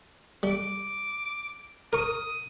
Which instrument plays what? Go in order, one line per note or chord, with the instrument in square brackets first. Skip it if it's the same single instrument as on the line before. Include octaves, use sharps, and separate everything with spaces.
[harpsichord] G3 [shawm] D6
[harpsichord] A#4 C#6 [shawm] D#6